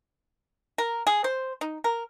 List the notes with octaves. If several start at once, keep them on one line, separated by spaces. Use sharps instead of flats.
A#4
G#4
C5
D#4
A#4